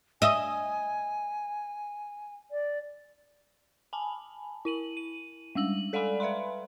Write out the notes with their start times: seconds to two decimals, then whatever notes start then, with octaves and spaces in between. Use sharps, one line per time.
0.22 D#5 E5 G#5
2.51 D5
3.93 G#5 A5 B5
4.65 E4 D#7 F#7
4.97 D#7
5.55 G3 G#3 E6 F#7
5.93 A4 D5 F5 F#5 G#5 B5
6.20 B4 E5 F5 B5 C6